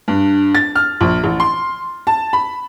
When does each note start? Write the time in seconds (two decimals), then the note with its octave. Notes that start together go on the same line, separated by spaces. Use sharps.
0.08 G2
0.55 A6
0.76 F6
1.01 A#1
1.24 A1
1.40 C6
2.07 A5
2.33 B5